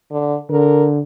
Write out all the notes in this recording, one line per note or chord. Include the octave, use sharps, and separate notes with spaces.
D3
D3 A#4